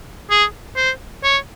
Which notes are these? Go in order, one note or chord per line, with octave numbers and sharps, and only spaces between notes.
G#4
C5
C#5